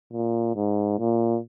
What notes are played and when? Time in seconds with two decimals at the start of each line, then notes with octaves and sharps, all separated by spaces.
0.13 A#2
0.55 G#2
0.99 A#2